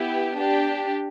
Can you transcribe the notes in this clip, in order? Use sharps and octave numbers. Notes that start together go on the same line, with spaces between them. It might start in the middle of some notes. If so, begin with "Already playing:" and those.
Already playing: B3 E4 G4
D4 G4